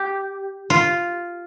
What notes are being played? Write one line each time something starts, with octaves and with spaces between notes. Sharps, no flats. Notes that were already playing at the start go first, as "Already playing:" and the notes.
Already playing: G4
F4